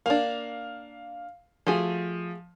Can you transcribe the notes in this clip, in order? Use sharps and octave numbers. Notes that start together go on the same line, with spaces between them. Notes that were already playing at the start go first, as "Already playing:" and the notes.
A#3 D4 F5
F3 A3 F#4 G#4